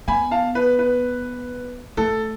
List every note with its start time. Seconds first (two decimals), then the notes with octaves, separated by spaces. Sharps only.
0.08 B3 G#5 B5
0.31 F5 A5
0.55 B4
0.79 B4
1.97 A3 A4